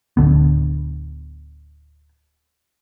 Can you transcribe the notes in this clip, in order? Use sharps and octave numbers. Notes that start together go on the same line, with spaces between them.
D1 C#2 D3 B3